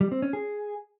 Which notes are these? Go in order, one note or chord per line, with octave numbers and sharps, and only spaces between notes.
G3
C4
C#4
G#4